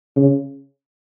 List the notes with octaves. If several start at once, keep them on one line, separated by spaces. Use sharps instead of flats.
C#3